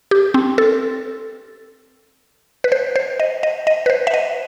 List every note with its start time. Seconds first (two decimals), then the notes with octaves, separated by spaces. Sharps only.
0.11 G4
0.34 C4
0.58 A4
2.64 B4
2.72 C5
2.96 C5
3.20 D#5
3.43 D#5
3.67 D#5
3.86 B4
3.90 C5
4.07 E5
4.14 D#5